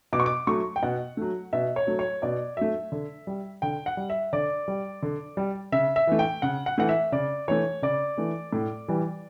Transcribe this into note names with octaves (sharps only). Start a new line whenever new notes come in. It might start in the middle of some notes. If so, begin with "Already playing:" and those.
B2 D6
C#6
D6
F#3 A3 C#6
G5
B2 F#5
F#3 A3
B2 E5
C#5
F#3 A3
C#5
B2 D5
F#3 A3 E5
D3
G3
D3 G5
F#5
G3
E5
D3 D5
G3
D3
G3
C#3 E5
E5
E3 A3
G5
C#3 F#5
F#5
E3 A3 F#5
E5
C#3 D5
E3 A3 C#5
C#3 D5
E3 A3
A2
E3 G3